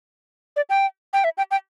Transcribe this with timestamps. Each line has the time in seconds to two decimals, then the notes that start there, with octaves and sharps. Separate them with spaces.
0.56 D5
0.70 G5
1.13 G5
1.24 E5
1.38 G5
1.51 G5